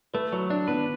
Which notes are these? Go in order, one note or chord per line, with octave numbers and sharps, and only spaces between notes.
A3 B4
F#3 B4
D4 D5
B3 B4